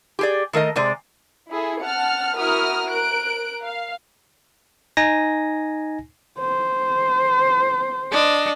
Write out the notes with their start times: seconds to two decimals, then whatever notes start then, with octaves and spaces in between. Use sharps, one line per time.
0.19 G4 G#4 D5
0.53 D#3 A3 A#4 D#5
0.76 C3 G#3 D5
1.49 E4 G#4 A4
1.81 F#5 A5 F6
2.37 E4 F#4 A#4 D#6 F6
2.90 A#4 F#6 D7
3.63 F5
4.97 D#4 G#5 A#6
6.39 C5
8.12 D4 D#5